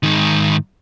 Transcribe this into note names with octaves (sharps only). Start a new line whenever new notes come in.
G#2 D#3